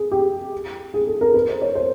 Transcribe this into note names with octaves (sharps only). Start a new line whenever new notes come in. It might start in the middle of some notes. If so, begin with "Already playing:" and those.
Already playing: G#4
G4
G#4
A4
A#4
B4
C5
C#5
C5